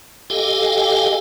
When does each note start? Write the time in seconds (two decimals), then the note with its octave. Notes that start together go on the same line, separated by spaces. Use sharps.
0.30 G4 A4 D#5 F5 G5 G#5